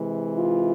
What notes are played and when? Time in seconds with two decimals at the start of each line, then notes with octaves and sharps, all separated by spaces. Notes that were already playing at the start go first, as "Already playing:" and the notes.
Already playing: C3 E3 G#3
0.36 F4